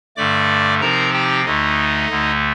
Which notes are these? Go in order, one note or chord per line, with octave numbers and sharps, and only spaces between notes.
G2 D3 A3 D5 D6
C3 F3 C4 D#4 A#4 A#5
G4 G5
D2 D3 A3 D#4 D#5
D2 D3 A3